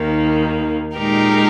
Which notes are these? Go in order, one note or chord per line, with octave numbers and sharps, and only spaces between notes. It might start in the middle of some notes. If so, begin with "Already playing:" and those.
Already playing: D#2 D#3 A#3
A#2 G#3 D#4 G4 A#4